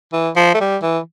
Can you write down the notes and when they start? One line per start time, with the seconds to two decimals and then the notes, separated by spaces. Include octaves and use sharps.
0.13 E3
0.36 F3
0.54 A3
0.60 G3
0.82 E3